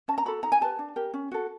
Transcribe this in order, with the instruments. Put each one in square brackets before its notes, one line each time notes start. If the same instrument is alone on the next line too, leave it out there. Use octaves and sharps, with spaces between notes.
[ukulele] C#4 A5
A#5
F#4 A4 B5
D#4 A#5
G#5
G4 B4 A5
D4
G4 A#4
C#4
F#4 A4